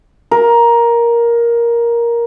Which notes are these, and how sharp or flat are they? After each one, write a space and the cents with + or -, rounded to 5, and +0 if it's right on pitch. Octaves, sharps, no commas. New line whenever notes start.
A#4 +10